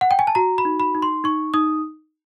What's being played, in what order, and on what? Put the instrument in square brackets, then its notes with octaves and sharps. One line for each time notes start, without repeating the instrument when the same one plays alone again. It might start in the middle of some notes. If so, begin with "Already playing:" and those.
[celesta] F#5
G5
G#5
A5
F#4 A#5
B5
D#4
B5
D#4
C6
D#4 C#6
D#4 D#6